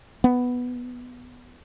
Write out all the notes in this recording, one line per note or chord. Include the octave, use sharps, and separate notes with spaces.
B3